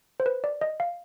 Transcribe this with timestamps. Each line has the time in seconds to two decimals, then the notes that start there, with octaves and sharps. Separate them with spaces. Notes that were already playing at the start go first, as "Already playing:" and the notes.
0.20 C5
0.26 B4
0.44 D5
0.61 D#5
0.80 F5